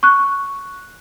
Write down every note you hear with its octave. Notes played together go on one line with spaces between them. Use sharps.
C#6 F#6